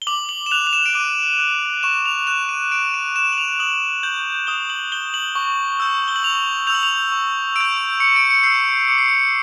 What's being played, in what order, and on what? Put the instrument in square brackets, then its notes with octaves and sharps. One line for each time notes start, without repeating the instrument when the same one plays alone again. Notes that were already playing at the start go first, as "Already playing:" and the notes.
[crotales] G7
D6 F#7
F#7
E7
F#6 F7
F7
E7
D7
D6 D#7
F#6
C#6 E7
F7
F#6 E7
D#7
C#6 D7
D#7
F#6 E7
F#7
F7
D#6 F#7
G6 F#7
D#6 G7
F#7
G6 G7
F#7
C#6
E6 G6
G7
F#7
C#6 F7
E6 G6 F7
F#7
F7
C#6
E6 G6 D7
C#6 C#7
D7
C#7
E6 G6 C7
D6 C#7
C7
C#7